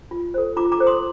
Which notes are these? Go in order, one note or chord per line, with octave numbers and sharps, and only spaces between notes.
F4
A4 C5
F4 A#5 D6
A#5 D6
A4 C5
C6 D#6